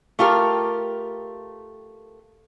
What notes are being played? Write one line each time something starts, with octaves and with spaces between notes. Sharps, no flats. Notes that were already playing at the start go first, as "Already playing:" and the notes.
A3 F4 G4 A#4